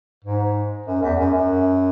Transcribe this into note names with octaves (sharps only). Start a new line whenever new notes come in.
G#2
F#2
E2
F#2
F#2